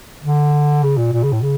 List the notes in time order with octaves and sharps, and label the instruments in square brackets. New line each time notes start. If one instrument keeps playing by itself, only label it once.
[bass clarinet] D3
C#3
A#2
A#2
C#3
A2
C#3